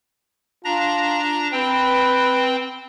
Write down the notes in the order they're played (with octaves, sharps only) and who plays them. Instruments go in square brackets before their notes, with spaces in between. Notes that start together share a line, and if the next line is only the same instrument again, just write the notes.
[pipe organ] D4 A#5 A#6 [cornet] F4
[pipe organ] C4 G5 [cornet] B4